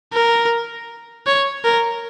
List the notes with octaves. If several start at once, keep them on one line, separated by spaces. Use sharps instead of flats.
A#4
C#5
A#4